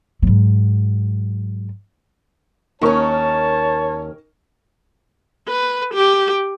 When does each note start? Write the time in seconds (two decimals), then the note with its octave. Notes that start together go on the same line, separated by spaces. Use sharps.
0.22 G#2 F#3
2.81 D#2 C#4 D#4 A#4 C#5 A5 C#6
5.48 B4
5.95 G4